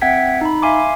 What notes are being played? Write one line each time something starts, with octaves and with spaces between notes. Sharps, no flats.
C4 E5 F#5 G5 G#6 B6
D#4 B5
E5 F5 G#5 C6 D6